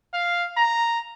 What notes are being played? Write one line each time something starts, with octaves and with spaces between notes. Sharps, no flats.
F5
A#5